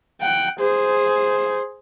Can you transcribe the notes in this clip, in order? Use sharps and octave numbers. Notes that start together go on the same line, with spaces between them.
F#5 G5
G#4 C5